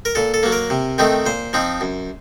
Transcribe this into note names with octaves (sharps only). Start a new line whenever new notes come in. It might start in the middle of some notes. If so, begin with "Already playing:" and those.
A#4
A#2 A4
A4
F#3 A#3
A#4
C3
D#3 A3 C4 D#4
A#2 C5
F3 C4 D#4
F#2